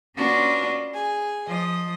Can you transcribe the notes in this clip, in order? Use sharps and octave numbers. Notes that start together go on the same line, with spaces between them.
A#3 C#4 D4 F4 F#4 B4
G#4 G#5
F3 D#5